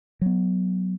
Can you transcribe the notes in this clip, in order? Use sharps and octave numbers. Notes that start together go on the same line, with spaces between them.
F#3 B3